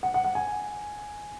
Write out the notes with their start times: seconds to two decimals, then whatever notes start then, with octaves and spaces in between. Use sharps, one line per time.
0.03 F#5
0.14 F#5
0.24 F#5
0.35 G#5